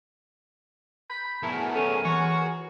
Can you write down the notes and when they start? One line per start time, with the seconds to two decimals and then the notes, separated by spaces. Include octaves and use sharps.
1.10 B5 G6
1.43 F#3 A3 B3 E4 G#4 A#4 A5
1.75 C#4 A4
2.05 E3 F#4 C#5